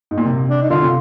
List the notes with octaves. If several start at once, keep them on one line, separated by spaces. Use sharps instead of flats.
G#2
A#2
C3
D4
D#4
D3 F4
C3